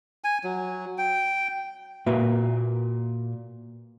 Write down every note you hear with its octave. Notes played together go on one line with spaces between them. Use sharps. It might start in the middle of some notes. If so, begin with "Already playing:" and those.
G#5
F#3
G5
A#2 A#3 F#4 B4 E5